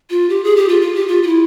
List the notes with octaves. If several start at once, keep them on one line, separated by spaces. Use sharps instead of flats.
F4
G4
G#4
G4
F4
F4
G4
F4
F4
E4